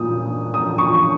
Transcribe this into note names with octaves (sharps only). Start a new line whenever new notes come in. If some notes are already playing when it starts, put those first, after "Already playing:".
Already playing: A#2 D#6
D#6
C#6